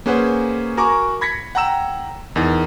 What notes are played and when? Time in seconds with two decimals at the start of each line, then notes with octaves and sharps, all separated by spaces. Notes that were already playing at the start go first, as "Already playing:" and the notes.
0.06 A#3 C#4 G#4 B4 C5 F#5
0.77 F#4 A#4 G#5 A#5 C#6 D6
1.21 B5 G#6 A#6 B6 C#7
1.55 F#5 G5 A#5 E6 E7
2.36 E2 D#4 A#4 A6